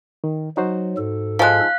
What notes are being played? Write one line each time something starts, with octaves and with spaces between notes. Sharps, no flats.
D#3
F#3 D#4 F#4 C5
G#2 A4
F3 G#3 F5 F#6